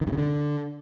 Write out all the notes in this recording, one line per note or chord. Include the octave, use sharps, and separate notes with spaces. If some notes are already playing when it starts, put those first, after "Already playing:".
D#3
G2
C#3
D3